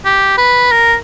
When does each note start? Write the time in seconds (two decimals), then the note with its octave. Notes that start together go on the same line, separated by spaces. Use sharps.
0.05 G4
0.38 B4
0.72 A#4